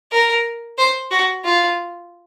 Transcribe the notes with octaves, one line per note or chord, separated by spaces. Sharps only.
A#4
C5
F#4
F4